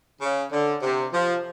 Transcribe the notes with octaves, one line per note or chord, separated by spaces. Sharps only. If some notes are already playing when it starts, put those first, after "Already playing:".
C#3
D3
C3
F3